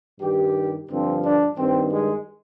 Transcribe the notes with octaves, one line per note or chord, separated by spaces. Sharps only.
G2 D#3 G4
G2 D3 F3 C4
D4
G2 D#3 C4
G#3